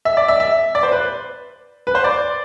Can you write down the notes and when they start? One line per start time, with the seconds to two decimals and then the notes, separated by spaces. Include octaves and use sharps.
0.05 E5
0.17 D5
0.28 E5
0.40 E5
0.75 D5
0.83 C5
0.92 B4
1.87 B4
1.95 C5
2.04 D5